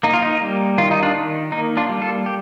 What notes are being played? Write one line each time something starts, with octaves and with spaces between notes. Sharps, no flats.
A#3 D#4
F4
D#4
G3
D#3 F4
D#4
D4 F4
D#3
A#3 D#4
D4 F4
G3
F4 A4
G4